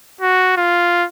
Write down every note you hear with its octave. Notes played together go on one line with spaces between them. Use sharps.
F#4
F4